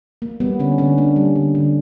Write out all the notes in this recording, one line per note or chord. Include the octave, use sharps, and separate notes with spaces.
A#3
G3 B3
D3 C#4
D3 C#4
A#3 D4
G3
D3
D3